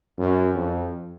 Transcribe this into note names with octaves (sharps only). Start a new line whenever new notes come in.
F#2
F2